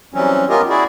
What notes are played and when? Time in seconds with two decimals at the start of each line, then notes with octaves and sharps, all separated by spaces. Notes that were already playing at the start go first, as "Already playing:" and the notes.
0.14 E3 F#3 G3 C4 C#4
0.50 B3 C#4 F4 G4 A#4 D#5
0.69 E4 F#4 G#4 D5